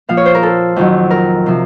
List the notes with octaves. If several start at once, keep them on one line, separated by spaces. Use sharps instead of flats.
A#2 F3 F5
C#5
C5
A#4
A4
F2 D#3 F#3
A#4
C3 F3